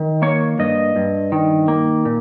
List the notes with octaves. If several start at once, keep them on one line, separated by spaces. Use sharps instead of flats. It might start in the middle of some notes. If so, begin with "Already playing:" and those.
Already playing: D#3
A#3 C#5
G2 D#5
G2
D#3
A#3
A#2